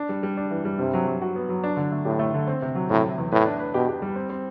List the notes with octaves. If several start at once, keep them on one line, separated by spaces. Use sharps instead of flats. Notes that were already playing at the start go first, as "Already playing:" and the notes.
Already playing: D4
G3
G3
D4
E3
G3
G2 C3
F#3
F#3
F#4
B3
F#3
D4
D3
A3
A2 G4
A3
D3
C4
C3
F#3
A2 C3
C3
E2
A2 B4
D4
B4
B2 G4
G4
G3
C4
C4